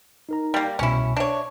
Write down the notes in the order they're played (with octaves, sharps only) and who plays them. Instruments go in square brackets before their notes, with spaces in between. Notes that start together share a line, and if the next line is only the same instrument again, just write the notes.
[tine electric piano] D#4 A#4 A#5
[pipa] G3 A#3
[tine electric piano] C2 B2 [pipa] C#4 E4
[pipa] D4 C#5 [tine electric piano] E5